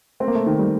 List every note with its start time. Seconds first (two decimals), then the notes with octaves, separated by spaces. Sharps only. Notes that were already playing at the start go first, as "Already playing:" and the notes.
0.20 A3 C4
0.28 A#3
0.36 A3
0.46 D#3
0.59 G3